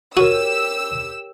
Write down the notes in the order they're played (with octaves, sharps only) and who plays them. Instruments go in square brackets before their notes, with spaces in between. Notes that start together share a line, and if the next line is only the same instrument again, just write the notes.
[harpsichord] F#4 [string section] G4 E6 [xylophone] A#4 C#5 D#7